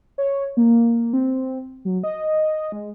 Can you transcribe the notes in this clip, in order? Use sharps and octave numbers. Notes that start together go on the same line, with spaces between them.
C#5
A#3
C4
F#3
D#5
G#3